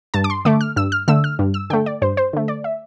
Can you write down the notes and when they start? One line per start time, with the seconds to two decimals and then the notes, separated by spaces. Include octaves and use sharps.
0.14 G2 A5
0.24 D6
0.30 C6
0.45 D3 A3 D6
0.61 F6
0.76 G2 E6
0.92 F6
1.08 D3 A3 E6
1.24 F6
1.39 G2
1.54 E6
1.70 D3 A3 G5
1.86 D5
2.02 G2 C5
2.17 C5
2.33 D3 A3
2.48 D5
2.64 E5